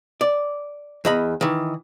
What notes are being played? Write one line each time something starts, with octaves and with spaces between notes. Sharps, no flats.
D5
E2 D#5 B5
D#3 E3